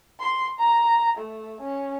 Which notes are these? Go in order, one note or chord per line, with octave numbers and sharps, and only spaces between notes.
C6
A#5
A3
C#4